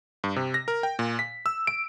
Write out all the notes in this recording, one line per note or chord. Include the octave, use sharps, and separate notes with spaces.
G2
C3
A#6
A#4
G5
A#2
B6
E6
D7